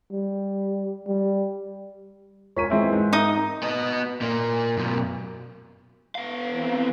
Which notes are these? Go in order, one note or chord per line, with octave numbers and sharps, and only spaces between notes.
G3
G3
E1 F4 A#4 C#5 B6 D#7
E3 G#3 C4 E4 C#5
G#2
D#4 A#4 E5 D#6
B3 D#5
A#2 A#3
F#2 B2
B3 F5
E3 C4